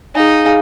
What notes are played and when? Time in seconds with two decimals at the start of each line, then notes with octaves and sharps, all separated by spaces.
0.15 D#4 G#4 F5 G#5
0.46 G#4 F5 G#5